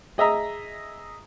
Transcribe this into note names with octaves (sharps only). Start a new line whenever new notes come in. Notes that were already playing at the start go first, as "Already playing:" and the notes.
G#4 D#5 E5 A#5